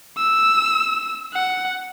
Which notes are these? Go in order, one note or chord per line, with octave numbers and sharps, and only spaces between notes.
E6
F#5